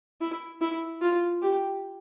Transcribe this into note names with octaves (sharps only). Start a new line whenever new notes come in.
E4
E4
F4
G4